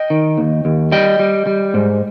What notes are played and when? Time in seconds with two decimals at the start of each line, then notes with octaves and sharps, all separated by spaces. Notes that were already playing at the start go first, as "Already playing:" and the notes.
Already playing: D#5 G5
0.10 D#3
0.38 D#2
0.65 D#2
0.92 G3 D#5 G5
1.19 G3
1.47 G3
1.74 G#2